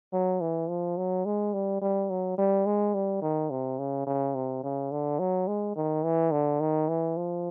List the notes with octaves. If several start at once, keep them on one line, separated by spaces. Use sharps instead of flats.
F#3
E3
F3
F#3
G#3
G3
G3
F#3
G3
G#3
G3
D#3
C3
C#3
C#3
C3
C#3
D3
F#3
G#3
D#3
E3
D3
D#3
E3
F3